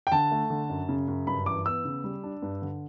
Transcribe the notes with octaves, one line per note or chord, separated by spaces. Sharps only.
G5
D3 A5
A3
D3
F#2
C#3
F#2
G2 B5
E3 D6
B3 E6
C#3
G3
D4
G2
D3